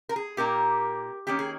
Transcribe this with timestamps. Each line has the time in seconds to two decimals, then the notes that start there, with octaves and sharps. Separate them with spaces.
0.09 A#4
0.16 G#4
0.37 A#2 A#3 D#4 G4 A#4
1.27 D#3 A#3 C#4 G4
1.39 G#4